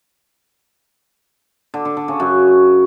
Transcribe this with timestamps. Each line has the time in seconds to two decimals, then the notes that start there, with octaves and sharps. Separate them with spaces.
1.74 D3
1.85 D3
1.97 D3
2.08 C#3
2.20 F#2